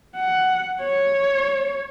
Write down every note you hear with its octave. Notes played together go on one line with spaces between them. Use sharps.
F#5
C#5